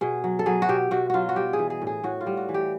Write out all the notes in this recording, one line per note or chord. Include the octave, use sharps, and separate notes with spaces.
B2 G#4
F#3
A4
F#3 G#4
F#4
B2 G4
B2 F#4
F#3 F4 F#4
F#4
G3 G4
G#4
E3
G#4
A2
G#4
A2 F#4
F4
G3
F#4
E3
G4